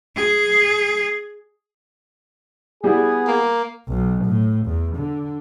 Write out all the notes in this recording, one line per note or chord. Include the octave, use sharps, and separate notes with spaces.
G#4
G3 B3 E4 G#4
A#3
B1
A2
E2
D3